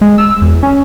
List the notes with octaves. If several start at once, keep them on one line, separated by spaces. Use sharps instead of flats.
G#3
E6
E2
C#4